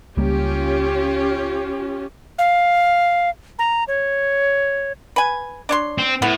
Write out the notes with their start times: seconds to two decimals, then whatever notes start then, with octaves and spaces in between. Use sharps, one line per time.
0.17 C#2 G3 A#3 C#4 F4 G4
2.38 F5
3.59 A#5
3.88 C#5
5.16 B4 G#5
5.69 D4 C#5 C6
5.98 C4
6.22 A2 B3